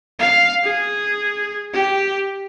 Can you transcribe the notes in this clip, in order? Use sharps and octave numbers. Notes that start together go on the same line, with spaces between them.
F5
G#4
G4